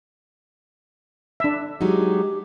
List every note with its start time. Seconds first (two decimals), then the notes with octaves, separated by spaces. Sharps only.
1.40 D4 E5
1.81 F#3 G#3 D#4 G4